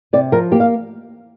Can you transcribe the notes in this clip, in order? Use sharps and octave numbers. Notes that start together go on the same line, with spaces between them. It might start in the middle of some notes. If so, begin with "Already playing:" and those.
C3 D5
F3 A#4
A#3 G4
F5